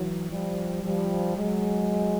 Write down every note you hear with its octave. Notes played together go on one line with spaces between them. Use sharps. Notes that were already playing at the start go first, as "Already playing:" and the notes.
Already playing: E3 F#3
F3 G3
F3 G3
F#3 G#3